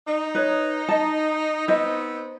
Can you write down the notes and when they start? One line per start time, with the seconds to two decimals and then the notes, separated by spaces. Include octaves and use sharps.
0.07 D#4
0.35 B4 C#5
0.89 D#5 A5
1.68 B3 C4 D#4 C5 D#5